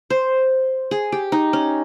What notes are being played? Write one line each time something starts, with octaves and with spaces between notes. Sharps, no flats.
C5
G#4
G4
D#4
C#4